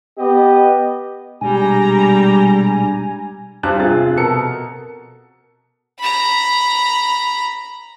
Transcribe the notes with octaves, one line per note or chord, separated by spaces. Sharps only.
B3 G4 D#5
B2 G3 G#3 D4 G#5 A#5
G2 G3 C5 F#6
C3 F4 G#4 A6
B2 A4 A#4 C#7
A#5 B5